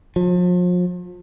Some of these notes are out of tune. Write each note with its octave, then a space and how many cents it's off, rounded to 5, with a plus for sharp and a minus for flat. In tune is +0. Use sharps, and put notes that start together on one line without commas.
F3 +40